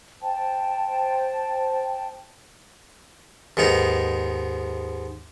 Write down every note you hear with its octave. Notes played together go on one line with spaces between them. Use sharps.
C5 G5 A5
D#2 G#2 B3 D#4